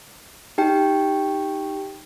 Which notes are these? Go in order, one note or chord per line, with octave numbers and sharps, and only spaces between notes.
D#4 G4 G5